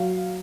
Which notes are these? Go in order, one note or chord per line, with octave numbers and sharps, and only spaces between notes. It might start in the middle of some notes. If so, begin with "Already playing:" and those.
Already playing: F#3 F5